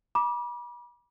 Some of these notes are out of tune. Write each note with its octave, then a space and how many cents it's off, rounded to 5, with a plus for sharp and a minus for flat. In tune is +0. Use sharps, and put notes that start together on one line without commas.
B5 -40 D6 +0